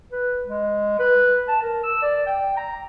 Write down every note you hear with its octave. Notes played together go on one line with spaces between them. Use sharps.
B4
G#3
B4
A5
A#4
E6
D5
G5
A#5